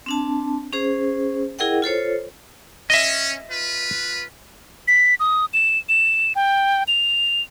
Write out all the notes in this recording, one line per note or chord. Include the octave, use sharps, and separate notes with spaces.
C4 D4 A5
C#4 G#4 C5
E4 G#4 A#4 D#5 F#5 G5
F4 A4 C5 C#5
C#4 D#5 E5
F4 B4
B6
D#6
E7
E7
G5
F7